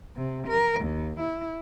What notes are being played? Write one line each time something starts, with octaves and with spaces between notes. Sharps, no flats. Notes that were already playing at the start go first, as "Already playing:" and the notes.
C3
A#4
D#2
E4